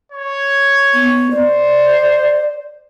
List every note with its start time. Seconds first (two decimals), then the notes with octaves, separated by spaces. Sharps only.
0.12 C#5
0.94 B3
1.31 C5 D5